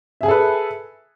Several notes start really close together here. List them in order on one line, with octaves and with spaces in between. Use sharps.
E5 G#4 G#5 A4 B4